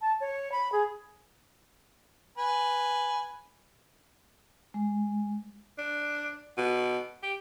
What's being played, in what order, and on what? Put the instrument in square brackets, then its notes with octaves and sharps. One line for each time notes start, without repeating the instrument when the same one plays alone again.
[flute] A5
C#5
B5
G#4
[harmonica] B4 G#5
[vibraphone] G#3
[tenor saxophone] D4
B2
G4